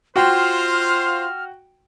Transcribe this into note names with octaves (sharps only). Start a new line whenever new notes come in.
F4 F#4 C5 G5 F6